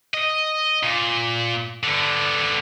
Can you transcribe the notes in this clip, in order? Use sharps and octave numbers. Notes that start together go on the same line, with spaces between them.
D#5
A#2
D3 B3